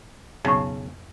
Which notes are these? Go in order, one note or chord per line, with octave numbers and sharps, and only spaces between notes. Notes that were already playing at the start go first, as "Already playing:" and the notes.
B1 F2 A2 C#3